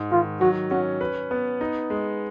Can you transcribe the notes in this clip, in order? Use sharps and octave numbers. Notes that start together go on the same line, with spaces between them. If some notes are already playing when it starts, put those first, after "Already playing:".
Already playing: G#2
D#3 F4
F#3 F#4
C#4 F#4
B4
B3
D#4
G#3